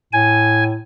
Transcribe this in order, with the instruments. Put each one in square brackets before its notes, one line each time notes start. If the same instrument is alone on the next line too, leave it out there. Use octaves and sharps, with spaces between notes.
[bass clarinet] A2 [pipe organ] G#5